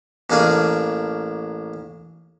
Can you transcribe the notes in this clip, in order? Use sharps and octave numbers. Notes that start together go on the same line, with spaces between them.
A1 A#3 D4 G#4 F5